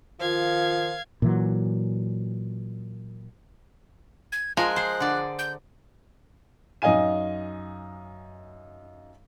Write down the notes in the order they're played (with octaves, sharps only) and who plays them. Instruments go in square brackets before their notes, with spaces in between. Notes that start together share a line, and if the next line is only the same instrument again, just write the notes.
[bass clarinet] D#3 [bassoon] F3 [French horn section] F4 [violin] F5 G#6
[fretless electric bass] A#2 E3 F#3
[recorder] G#6
[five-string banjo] F3 [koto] G#3 A#4 G#5 [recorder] F#6
[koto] G#4 C5
D3 D5
[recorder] G6
[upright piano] F#2 D#4 D#5 F5 G#5 D#7